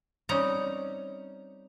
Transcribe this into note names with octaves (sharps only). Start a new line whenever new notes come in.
G3 C4 C#4 D#4 A#5